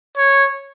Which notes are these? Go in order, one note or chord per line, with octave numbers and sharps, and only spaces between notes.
C#5